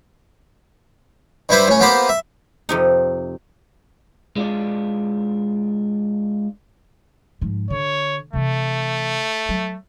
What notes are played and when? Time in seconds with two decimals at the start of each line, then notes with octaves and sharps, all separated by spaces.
1.49 G2 G3 E4 B4 C5
1.68 A2 C#4
1.80 A#3 B3 G4 B4 C5
2.09 E5
2.69 F2 C3 D#4
4.36 G#3 D4 F4 D5
7.41 G#2 F3
7.70 D3 C#5
8.33 C3 E3 A3
9.49 F#3